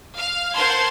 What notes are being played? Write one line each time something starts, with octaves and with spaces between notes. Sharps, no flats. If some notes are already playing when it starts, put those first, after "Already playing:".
F5 F6
A#4 C5 F#5 A5 C6 G#6